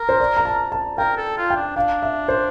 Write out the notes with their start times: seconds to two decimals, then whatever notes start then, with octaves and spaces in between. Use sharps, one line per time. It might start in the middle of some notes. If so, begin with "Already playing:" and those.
Already playing: A#4
0.09 C5
0.20 D5
0.37 A#5
0.45 A5
0.72 A5
0.98 A#4 G5
1.17 A4
1.37 F4
1.50 G5
1.56 D4
1.76 D4 F5
2.03 E5
2.28 C5